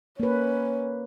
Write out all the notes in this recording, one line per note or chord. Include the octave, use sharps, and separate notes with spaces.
A#3 C#4 B4